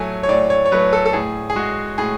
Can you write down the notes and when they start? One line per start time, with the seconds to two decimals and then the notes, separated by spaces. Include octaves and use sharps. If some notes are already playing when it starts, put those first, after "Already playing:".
Already playing: A2 F#3 A3 G#5
0.23 C#5
0.29 A2 D5
0.50 C#5
0.66 C#5
0.72 F#3 A3 B4
0.93 A4
1.06 A4
1.13 A2 G#4
1.50 G#4
1.56 G#3 F#4
1.98 A2 G#4